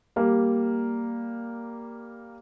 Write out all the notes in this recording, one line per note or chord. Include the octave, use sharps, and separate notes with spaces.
G3 A#3